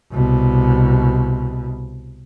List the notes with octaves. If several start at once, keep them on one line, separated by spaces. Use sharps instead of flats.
C2 B2